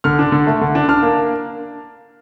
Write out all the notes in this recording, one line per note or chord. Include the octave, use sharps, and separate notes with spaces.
D3 F6
D4
D3
A3
D3
D4
D4 F6
A#3